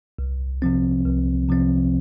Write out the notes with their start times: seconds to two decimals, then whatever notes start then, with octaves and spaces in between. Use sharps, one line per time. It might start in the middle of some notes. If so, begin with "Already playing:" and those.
0.19 C2
0.62 C3 F3 C4
1.06 C2
1.49 C3 F3 C4